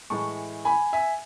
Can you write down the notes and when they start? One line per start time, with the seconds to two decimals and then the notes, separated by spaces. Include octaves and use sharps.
0.10 A2 E3 G#3 A5 C#6
0.65 G#5 B5
0.93 E5 G#5